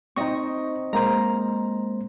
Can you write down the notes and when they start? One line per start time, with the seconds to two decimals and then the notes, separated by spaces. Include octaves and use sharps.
0.16 C4 D#4 D#5 C#6
0.93 G#3 A#3 C5 A#5